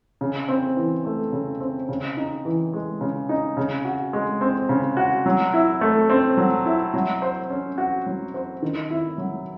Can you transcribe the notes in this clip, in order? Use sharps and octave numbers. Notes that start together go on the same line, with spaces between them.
C#3
C4
E3
A3
C#3
C4
C#3
D#4
E3
G#3
C#3
D#4
C#3
F#4
G#3
C4
C#3
F#4
F#3
E4
A3
C4
F#3
E4
F#3
C5
C#4
F#4
F#3
C5
D#3
E4
F#3